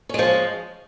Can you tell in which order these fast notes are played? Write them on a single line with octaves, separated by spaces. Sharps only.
C#4 G#3 F3